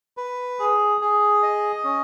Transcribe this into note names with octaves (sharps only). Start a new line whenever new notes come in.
B4
G#4
G#4
D#5
C#4